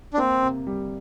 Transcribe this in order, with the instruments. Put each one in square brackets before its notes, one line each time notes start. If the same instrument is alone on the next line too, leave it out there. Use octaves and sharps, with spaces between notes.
[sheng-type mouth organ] D4
[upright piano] A#3 [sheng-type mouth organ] C4
[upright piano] C3
G3